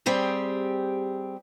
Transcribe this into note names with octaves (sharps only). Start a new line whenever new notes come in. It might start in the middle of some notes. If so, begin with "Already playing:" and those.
G3 C4 G4 G#4